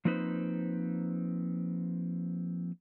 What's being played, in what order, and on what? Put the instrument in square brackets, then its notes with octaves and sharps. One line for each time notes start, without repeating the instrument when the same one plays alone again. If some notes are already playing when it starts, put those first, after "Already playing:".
[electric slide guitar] F3 A#3 C4 D#4 B4 C5